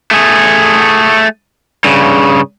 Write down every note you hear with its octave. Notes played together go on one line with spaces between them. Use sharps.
A3 G#4
G2 C#3